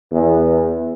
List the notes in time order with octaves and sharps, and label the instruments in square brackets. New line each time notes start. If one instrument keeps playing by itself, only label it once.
[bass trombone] E2